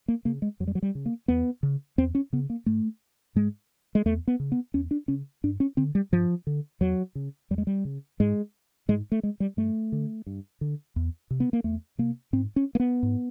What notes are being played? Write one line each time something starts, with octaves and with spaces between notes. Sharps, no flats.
A#3
C#3 A#3
G#3
F2 F#3
G3
F#3
G3
C#3
A#3
E2 B3
C#3
E2 C4
C#4
C#3 B3
A#3
G#2 A3
G#2 G#3
G#3
E2 A3
B3
C#3
B3
E2 C#4
D4
C#3 C#4
G2 D4
C#4
D3 C4
G3
G2 F3
D3
E2 F#3
C#3
E2 G3
G#3
G3
C#3
G#2 G#3
G#2 G#3
A3
G#3
G3
G2 A3
D3
G2
D3
E2
C3
B3
A#3
E2 A3
C3 A#3
G#2 C4
C#4
A#3
B3
G#2